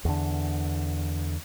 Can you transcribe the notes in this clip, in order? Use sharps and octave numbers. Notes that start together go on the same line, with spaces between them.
E2 D3